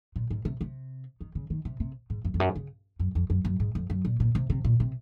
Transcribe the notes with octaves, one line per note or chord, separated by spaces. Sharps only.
A#2
G#2
C3
C3
D#3
C#3
D#3
C3
C3
G#2
F#2
F2
F#2
C#3
F#2
F2
F#2
F#2
G#2
F2
F#2
A#2
A#2
C3
C3
A#2
C3